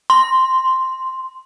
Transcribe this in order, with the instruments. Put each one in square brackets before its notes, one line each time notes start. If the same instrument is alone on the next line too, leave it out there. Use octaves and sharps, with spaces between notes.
[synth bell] C6